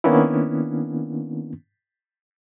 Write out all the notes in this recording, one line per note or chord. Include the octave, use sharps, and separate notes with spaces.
D#3 A#3 B3 C#4 D4 E4